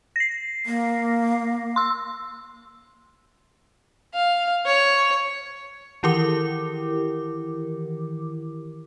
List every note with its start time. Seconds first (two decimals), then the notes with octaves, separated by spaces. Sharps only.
0.16 A#6 C7
0.66 A#3
1.76 C6 E6
4.14 F5
4.66 C#5
6.03 D#3 E3 E4 G4 A#4 D6